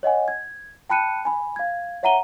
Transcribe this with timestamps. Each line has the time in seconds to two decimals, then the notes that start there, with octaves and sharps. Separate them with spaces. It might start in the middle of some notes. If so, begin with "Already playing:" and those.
0.03 C#5 D#5 F#5 G#5
0.28 G#6
0.90 G5 A5 B5 F#6 C#7 D#7
1.25 G#5 B5
1.56 F5 G#6
2.03 C#5 E5 F#5 A#5 D#7 G7